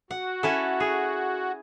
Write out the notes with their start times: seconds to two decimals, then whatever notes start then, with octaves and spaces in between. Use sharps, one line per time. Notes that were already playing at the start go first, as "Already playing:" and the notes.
0.11 F#4 F#5
0.43 C#4 E4 A4
0.80 G#4